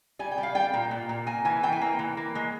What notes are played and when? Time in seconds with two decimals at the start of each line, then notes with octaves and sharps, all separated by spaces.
0.19 G3 G#5
0.32 G5
0.38 G3
0.43 F5
0.55 G3 G5
0.74 A#2
0.91 A#2
1.09 A#2
1.27 A#3 G#5
1.45 E3 G#5
1.63 E3 G5
1.72 G#5
1.81 A#3 G5
1.99 E3
2.17 A#3
2.35 G#3